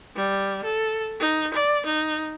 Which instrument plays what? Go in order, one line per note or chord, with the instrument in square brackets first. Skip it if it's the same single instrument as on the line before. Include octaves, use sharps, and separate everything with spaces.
[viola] G3
A4
D#4
D5
D#4